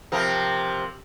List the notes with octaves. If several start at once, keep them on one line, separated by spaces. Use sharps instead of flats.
C3 F3 A#4